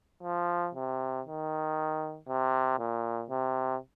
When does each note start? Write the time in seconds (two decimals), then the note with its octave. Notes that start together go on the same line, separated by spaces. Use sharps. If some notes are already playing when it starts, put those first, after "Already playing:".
0.23 F3
0.75 C3
1.26 D#3
2.28 C3
2.79 A#2
3.30 C3